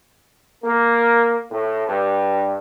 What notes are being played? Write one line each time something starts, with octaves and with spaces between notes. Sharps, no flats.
A#3
A2
G2